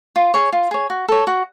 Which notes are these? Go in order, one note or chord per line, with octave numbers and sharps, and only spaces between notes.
F4
G#4 C#5
F4
G#4 C#5
F#4
A4 C#5
F#4